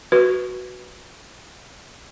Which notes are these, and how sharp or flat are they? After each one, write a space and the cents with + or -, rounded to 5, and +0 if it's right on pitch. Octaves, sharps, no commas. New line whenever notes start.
F#4 +0 B4 -5